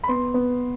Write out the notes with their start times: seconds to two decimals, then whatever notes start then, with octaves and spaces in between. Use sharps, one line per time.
0.03 B5
0.08 B3 C6
0.34 B3